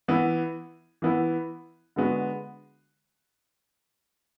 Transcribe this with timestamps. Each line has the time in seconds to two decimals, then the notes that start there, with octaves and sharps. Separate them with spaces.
0.08 E3 B3 E4
1.02 E3 B3 E4
1.96 D3 G#3 B3 F#4